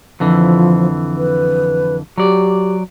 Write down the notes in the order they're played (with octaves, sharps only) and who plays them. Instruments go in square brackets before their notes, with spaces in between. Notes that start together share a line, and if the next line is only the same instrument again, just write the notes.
[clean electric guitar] F2 D3 E3 [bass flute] F3
[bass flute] B4
[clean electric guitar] F#3 D5 [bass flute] G4